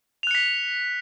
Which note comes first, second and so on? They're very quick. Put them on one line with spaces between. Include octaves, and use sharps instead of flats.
F7 F#6 C#7 B6